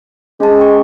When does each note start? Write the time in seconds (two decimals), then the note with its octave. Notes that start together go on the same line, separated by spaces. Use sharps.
0.40 G#3 C#4 A5
0.60 G5 C#6